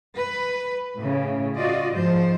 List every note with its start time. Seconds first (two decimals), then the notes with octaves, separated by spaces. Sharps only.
0.16 B4
0.96 A2 C#3
1.57 F4 F#4 D5 D#5
1.92 G#2 F3 C5